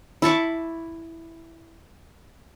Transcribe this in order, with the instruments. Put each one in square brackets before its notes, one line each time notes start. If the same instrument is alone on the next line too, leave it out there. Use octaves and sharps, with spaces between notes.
[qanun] E4 A5 C#6 D6